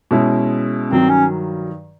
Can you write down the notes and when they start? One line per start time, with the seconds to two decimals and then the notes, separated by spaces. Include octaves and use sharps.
0.11 B2 G#3 C#4 E4
0.90 G2 D#3 F#3 C4
1.09 C#4